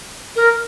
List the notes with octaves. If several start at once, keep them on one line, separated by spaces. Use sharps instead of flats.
A#4